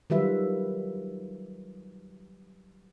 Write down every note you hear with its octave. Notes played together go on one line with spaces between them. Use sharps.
D#3 F#3 G3 F4 B4 E5